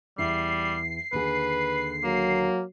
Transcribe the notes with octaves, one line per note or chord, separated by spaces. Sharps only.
E2 G3 E4 C7
D#2 D3 G#4 B4
F#3 A#3